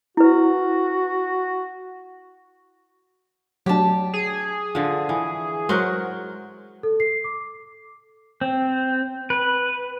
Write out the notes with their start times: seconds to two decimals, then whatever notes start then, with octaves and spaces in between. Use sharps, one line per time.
0.17 E4 F#4 B4
3.66 F#3 A3 D4 G4 A5
4.14 G#4
4.75 D3 F3
5.09 E3
5.69 F#3 G#3 A#4 C5 F#5 C#6
6.83 A4
7.00 C7
7.24 D6
8.41 C4
9.30 B4